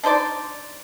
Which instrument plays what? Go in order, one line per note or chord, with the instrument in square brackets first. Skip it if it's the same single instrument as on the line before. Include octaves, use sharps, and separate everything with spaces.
[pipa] D4 D#4 C5 D5